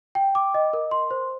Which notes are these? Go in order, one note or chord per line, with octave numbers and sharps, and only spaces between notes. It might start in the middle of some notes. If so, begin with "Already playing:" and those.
G5
D6
D#5
A#4
C6
C5